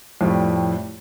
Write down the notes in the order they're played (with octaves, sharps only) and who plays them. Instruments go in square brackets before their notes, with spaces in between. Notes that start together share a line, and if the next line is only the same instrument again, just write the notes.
[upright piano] F2 A2 G3 A3